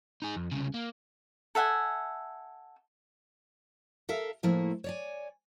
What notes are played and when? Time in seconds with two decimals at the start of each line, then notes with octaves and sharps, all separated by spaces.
0.22 D#4 G#4
0.36 F2
0.51 C2 C#3
0.74 A#3
1.55 A4 E5 F#5 G#5
4.09 A4 A#4 E5 F5
4.43 A2 F3 A3 A#3 E4
4.84 C#5 D5 G#5